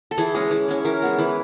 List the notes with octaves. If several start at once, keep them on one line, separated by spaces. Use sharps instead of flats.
A4
E3 G#4
G#3 C#4
E3
G#3 C#4
E3 A#4
G#3 B3
E3 B4